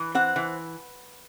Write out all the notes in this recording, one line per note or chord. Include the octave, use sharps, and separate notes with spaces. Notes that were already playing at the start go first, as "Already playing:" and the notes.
Already playing: E3
C4 F#5
E3